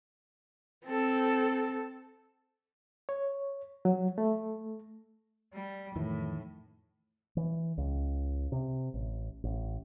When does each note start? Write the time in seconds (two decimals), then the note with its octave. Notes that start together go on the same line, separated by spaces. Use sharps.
0.85 C4 A4
3.09 C#5
3.85 F#3
4.18 A3
5.54 G3
5.96 F2 A2 D#3 E3
7.37 E3
7.78 C#2
8.52 C3
8.94 A1
9.44 A1